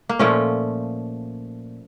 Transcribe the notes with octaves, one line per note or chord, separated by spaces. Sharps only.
A#3
A#2 F3 A3 C#4